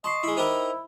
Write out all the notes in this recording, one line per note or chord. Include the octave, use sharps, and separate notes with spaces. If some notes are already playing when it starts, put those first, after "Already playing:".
D#5 A5 C6 C#6 C7
G#3 E4
D#4 E4 G4 A#4 C5 D#5 B5